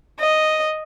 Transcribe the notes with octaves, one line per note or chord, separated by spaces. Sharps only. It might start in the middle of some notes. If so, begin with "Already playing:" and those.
D#5